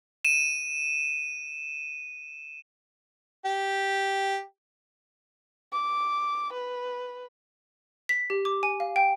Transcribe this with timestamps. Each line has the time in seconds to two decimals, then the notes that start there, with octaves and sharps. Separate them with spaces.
0.25 D#7 E7
3.45 G4
5.72 D6
6.53 B4
8.09 B6
8.30 G4
8.45 D6
8.63 G#5
8.80 F5
8.96 G5